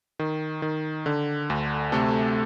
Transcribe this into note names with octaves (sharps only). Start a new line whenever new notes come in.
D#3
D#3
D3
D2
C3 A3 A4